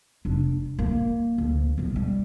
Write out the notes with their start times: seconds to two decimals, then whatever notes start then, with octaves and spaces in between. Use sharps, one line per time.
0.25 F1 D4
0.79 A#3
1.38 D2
1.78 B1 B2
1.96 G3